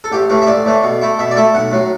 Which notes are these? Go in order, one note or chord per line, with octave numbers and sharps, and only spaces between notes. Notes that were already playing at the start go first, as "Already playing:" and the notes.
A4
A1 G4
A2 E3 A3
E5
A1 D5
A2 E3 A3
B2
A3 E4
B2 E5
D5
A3 E4 E5
B1 F#5
A2 F#3